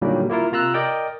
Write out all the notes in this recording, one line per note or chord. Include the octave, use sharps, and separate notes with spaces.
A#2 D3 D#3 F#3 G3 A#3
A#3 E4 F4 A#4
C3 F4 A#5 E6 F#6
A#4 D5 D#5 G5